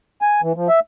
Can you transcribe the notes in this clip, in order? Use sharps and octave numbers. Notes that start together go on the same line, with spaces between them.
G#5
E3
F3
E5